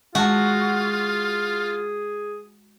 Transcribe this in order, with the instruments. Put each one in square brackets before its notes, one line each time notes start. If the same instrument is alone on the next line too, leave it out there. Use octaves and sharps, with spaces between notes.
[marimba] G#3 A5 [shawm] F4 [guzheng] F#4 [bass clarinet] G#4